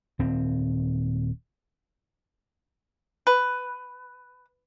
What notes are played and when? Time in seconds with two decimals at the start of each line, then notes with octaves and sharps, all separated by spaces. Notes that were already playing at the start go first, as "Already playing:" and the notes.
0.19 D#1 C4
3.27 B4